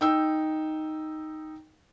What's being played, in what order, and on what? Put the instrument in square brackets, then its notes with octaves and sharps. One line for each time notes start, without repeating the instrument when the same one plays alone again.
[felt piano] D#4 G5 E6